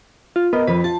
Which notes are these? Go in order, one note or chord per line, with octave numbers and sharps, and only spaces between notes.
F4
B3 A#4 D#5
F2 B4
F4 A5